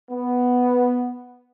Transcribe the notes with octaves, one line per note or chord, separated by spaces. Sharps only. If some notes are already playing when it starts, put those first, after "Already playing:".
B3